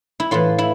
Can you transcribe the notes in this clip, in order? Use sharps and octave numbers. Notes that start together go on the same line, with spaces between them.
E4
A2 E3 F4
E4